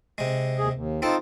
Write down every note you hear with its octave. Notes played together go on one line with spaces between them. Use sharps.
C3 G#3
D#2 G#4
D#2
C4 D#4 F4 A4